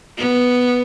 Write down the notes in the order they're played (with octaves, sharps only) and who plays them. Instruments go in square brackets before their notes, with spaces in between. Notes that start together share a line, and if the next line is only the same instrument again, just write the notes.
[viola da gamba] B3